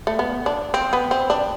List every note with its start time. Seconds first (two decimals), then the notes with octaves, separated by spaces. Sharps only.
0.07 A3
0.19 B3
0.46 D4
0.74 C4
0.93 B3
1.11 C4
1.30 D4